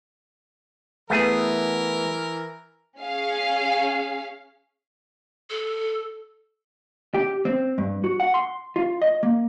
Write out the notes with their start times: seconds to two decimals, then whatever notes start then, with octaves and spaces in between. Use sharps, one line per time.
1.10 E3 A3 B3 G#4 A#4
2.99 C#4 G#4 F5
5.50 A4
7.14 G4
7.45 C4
7.78 G2
8.04 F#4
8.20 F#5
8.34 C6
8.76 F4
9.02 D#5
9.23 A#3